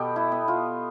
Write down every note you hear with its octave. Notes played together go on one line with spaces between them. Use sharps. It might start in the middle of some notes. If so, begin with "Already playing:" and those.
Already playing: B2 B3 G4 A4 B4
E4
B3
F4